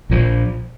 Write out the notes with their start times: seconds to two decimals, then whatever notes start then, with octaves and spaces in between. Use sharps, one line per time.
0.10 A#1 A#2 F3